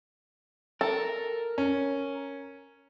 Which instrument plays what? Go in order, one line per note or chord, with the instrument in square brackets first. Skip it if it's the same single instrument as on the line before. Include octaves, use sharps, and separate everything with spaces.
[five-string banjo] A4 [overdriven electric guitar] A#4
[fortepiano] C#4